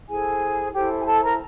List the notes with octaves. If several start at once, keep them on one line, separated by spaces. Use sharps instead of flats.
E4 G#4 A4 C5 G#5
E4 G4 A4 C5 G5
G#5
A4 A5
A#4 A#5